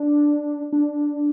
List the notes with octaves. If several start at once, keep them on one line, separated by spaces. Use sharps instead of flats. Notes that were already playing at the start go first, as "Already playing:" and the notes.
Already playing: D4
D4